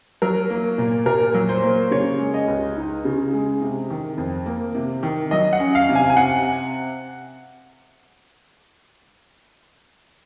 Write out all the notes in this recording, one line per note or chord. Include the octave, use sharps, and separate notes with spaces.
F#3 A#4
A#3
A#2
A#2 A#4
F#3
C5
A#3
C#3 C#5
G#3
D#5
C#2
D#4
C#3
G#3
C3
D#3
F2
A#3
C3
D#3
F#3 D#5
F#5
C#4
F5
C3
G#5
G#5
C3 F#5